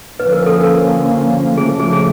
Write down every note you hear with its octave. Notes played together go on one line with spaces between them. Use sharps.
D3 F3 A#3 C#4 B4
A#4
A4
A#4
C#3 F3 A3 G#4
G#4
G#4